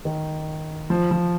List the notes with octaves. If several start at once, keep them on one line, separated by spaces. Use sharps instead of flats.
D#3
F3
F3